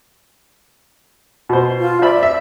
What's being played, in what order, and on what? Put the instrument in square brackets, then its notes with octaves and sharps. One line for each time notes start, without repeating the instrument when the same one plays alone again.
[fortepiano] B2 C5
[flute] F4
[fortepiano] C5 E5 B5 [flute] D5
[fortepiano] E5